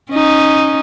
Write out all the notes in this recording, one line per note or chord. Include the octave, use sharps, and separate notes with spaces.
C#4 D#4